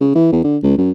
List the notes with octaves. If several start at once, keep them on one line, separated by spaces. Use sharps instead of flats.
C#3
E3
E2
D3
C#2
F#2